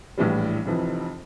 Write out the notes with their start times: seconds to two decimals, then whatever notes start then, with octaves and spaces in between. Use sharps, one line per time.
0.17 A#1 A2 E3 G3
0.66 F1 F2 E3